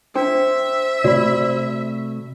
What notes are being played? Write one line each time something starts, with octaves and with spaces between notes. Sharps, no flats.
D4 C5 E5 G5
C3 A3 F#4 D5 B5